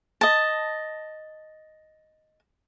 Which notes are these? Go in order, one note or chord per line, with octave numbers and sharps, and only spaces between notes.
D#5 A5